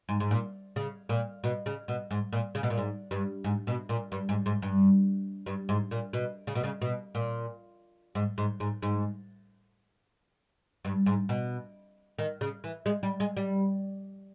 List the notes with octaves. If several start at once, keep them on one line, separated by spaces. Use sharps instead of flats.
G#2
G#2
A#2
C#3
A#2
B2
C#3
B2
G#2
A#2
C#3
B2
A#2
G#2
G2
G#2
B2
A#2
G2
G#2
G#2
G2
G2
G#2
A#2
B2
C#3
B2
C#3
B2
A#2
G#2
G#2
G#2
G#2
G2
G#2
B2
D#3
C#3
E3
G#3
G3
G#3
G3